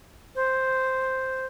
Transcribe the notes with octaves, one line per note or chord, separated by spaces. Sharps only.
C5